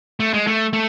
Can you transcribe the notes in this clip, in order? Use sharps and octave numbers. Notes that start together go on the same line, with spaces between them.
A3
G#3
A3
A3